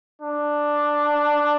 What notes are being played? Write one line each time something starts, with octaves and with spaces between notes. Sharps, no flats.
D4